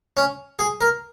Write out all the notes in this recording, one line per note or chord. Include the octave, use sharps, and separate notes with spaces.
C#4
G#4
A#4